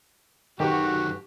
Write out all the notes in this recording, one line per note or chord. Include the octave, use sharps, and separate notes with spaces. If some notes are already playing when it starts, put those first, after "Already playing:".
F#2 D#3 F#4 G4 A4 B4